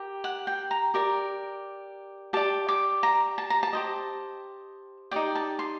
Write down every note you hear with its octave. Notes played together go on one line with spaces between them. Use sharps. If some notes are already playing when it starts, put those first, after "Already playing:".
Already playing: G4 A#4
F#5
G5
A#5
G4 A#4 D5
G4 D5 A5
D6
A#5
A5
A#5
A5
G4 C5 D#5
D#4 G4 D5 G5
A5
C6